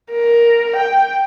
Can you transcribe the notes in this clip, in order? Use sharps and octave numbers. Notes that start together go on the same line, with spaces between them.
A#4
G5